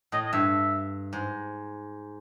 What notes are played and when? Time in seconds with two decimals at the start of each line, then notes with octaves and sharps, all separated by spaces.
0.12 A2 D#5
0.26 D#5
0.33 G2 E5
1.13 G#2